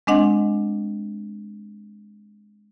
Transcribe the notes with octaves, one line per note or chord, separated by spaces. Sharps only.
G#3 C4 D4 D#5 F#5